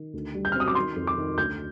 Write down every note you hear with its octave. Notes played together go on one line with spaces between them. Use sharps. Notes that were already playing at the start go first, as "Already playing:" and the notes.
Already playing: D#3
D2
G3
G6
C4 F6
D#6
D6
D#3 C6
F2
D6
D#3
D2 G6